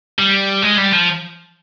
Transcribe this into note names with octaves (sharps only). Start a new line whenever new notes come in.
G3
G#3
G3
F3